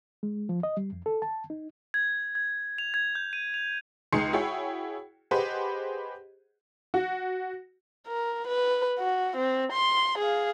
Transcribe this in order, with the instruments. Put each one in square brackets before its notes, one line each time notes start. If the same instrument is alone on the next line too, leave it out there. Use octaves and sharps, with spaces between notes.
[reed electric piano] G#3
F3
D#5
G3
F2
A4
A5
D#4
[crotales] G#6
G#6
F7
G#6
G6
D#7
F7
[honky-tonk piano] C#2 D#4 G#4 C6 C7 C#7
E4 F#4 G#4 C#5 G5
G4 G#4 B4 C5 D#5 F#5
F#4
[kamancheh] A#4
B4
F#4
C4
C6
G#4 F5